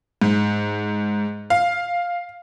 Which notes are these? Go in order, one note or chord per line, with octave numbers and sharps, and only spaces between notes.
G#2
F5